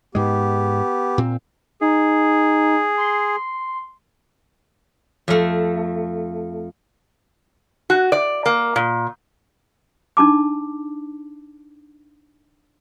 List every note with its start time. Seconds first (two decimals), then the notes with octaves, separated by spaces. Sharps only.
0.15 G#2 G#3 B3 G4
1.18 A#2 C4
1.81 D#4 G#4
2.97 C6
5.28 F2 A3
7.90 F#4
8.12 D5
8.46 A#3
8.76 A#2
10.17 D4 D#4 A5 D6